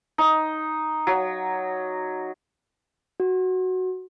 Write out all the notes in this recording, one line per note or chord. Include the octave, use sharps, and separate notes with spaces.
D#4
F#3
F#4